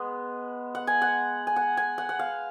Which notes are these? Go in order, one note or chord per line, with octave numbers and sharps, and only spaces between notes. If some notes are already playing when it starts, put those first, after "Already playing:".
Already playing: G#3 B3
F#5
G#5
F#5
G#5
F#5
G#5
F#5
F#5
F5